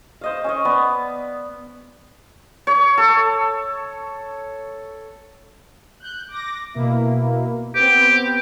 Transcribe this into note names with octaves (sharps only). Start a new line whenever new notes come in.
C5 D#5 F5
C#4 C#5 D#5
B3 D5
C#5
A4
F#6 G6
D6 A#6
B2 A#3 E4
B3 C4 G4